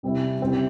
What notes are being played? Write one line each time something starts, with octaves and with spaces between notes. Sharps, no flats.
C3 G3 C4 E4
C#3 G3 C4 E4